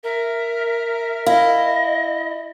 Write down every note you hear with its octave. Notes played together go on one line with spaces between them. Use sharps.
A#4 E5
E4 D#5 F5